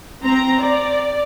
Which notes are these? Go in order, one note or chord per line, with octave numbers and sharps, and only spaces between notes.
C4 A#5
D5